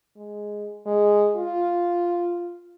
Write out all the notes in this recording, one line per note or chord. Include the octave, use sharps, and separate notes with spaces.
G#3
G#3
F4